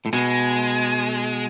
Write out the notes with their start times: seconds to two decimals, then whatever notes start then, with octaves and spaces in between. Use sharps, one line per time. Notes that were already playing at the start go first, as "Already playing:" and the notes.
0.06 A2
0.13 B2 G#3